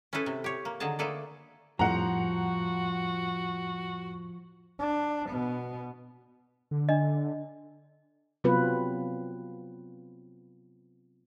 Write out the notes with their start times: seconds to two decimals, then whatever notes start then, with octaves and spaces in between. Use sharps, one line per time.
0.13 C#4 E4 G#4 A4 B4
0.26 C3
0.44 G4 C#5
0.65 A#3
0.80 D3 D#3 F#3 G#4 A5
0.99 A3 A#3 G#4 A4 B4 D5
1.79 F2 A2 F3 G3 F#4 F#5 A#5
4.79 D4
5.29 B2 B3
6.71 D3
6.89 D4 D#5
8.44 C3 F#3 B3 C4 F4 B4